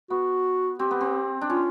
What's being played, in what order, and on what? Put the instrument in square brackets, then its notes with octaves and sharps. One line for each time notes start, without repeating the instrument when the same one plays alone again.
[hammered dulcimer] B3 [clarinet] F#4
[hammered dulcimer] C4 [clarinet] G4
[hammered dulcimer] B3
C4
D4
[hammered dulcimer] C#4 [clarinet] F4